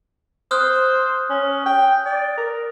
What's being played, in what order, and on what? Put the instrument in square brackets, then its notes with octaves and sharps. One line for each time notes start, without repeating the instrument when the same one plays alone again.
[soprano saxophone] C5 [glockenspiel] D#6 F6 F#6
[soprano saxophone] C#4
G5
D5
A#4